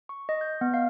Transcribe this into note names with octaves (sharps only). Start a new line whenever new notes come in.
C#6
D#5
G6
B3
F5